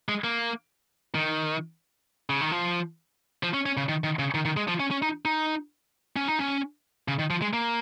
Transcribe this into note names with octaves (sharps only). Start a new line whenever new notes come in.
G#3
A#3
D#3
C#3
D#3
F3
F3
C#4
C#4
C#3
D#3
D#3
C#3
D#3
D#3
G#3
F3
C#4
C#4
D#4
D#4
C#4
D#4
C#4
C#3
D#3
F3
G#3
A#3